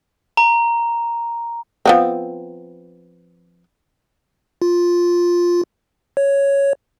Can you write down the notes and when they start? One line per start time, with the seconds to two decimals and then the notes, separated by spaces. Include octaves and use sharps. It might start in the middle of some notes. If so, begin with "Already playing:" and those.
0.37 A#5
1.86 F3 B3 C4
4.62 F4
6.17 C#5